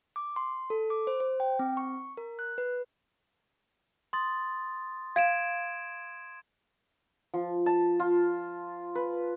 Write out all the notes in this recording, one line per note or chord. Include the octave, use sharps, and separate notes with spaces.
D6
C6
A4
D6
C5
C5
G5
C4
C#6
A#4
F#6
B4
C6 D#6 A6
F5 G#6 D7 E7
F3
A5
F4
B4